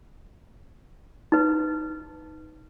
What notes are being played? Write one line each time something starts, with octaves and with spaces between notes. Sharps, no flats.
D#4 B4